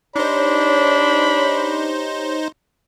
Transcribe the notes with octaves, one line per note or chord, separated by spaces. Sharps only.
D4 D#4 G4 C5 C#5 B5